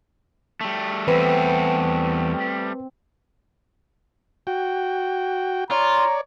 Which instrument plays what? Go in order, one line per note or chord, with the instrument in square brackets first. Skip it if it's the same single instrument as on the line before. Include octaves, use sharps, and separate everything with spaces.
[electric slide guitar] G3 A3
[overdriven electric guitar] E2 [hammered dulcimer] C4 [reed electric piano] B4
[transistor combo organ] F#4 G5
[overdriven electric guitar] F4 [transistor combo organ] C#5 D5 [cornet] A#5